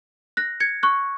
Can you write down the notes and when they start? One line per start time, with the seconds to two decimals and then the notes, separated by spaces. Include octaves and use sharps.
0.37 F#6 A#6
0.60 G#6 C#7
0.83 C#6 F#6